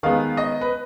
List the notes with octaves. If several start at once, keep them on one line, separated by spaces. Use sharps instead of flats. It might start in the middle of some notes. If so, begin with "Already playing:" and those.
D#3 G#3 B3 F5
D#5
B4